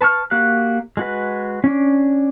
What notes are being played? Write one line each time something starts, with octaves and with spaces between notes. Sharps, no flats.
B4 A5 C#6 F6
A#3 F#4 G4 F5 F#6
G#3 F#4 B4
C#4 D4